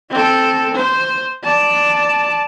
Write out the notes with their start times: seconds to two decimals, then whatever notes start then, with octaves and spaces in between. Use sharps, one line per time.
0.10 C4 A4
0.75 C5
1.44 D5 A5